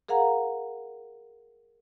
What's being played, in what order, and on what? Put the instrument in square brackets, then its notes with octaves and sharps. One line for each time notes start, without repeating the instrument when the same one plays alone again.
[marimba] G#4 A#4 F5 F#5 A#5